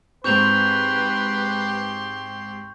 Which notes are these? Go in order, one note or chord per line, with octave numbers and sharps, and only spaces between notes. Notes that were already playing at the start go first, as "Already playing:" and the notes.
G#2 C4 G4 B4 C6 C#6 G6 F7